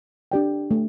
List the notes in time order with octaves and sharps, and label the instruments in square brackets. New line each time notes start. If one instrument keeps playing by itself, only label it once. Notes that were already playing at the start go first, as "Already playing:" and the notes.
[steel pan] D4 G4 D5 G5
A3